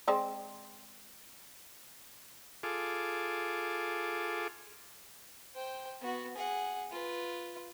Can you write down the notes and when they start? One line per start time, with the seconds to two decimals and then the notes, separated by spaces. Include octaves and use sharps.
0.07 G#3 C4 D5
2.63 F4 G#4 A4 D6
5.55 C5 G5
6.01 B3 F#4
6.36 G#4 F#5
6.91 F4 B4